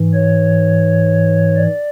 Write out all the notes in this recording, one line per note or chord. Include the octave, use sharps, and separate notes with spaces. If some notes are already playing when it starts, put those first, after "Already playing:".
Already playing: G#2 E3
C#5
D5